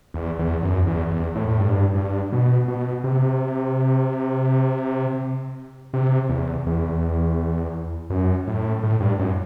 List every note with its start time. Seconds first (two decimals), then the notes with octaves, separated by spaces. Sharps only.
0.14 E2
0.39 E2
0.62 F#2
0.87 E2
1.11 E2
1.35 A2
1.48 A2
1.60 G2
1.95 G2
2.32 B2
2.68 B2
3.04 C3
5.94 C3
6.29 E2
6.66 E2
8.10 F#2
8.47 A2
8.83 A2
9.00 G2
9.19 F#2